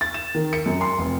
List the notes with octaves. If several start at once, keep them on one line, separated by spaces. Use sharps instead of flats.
A6
E7
D#3
C#7
F#2
C6
F1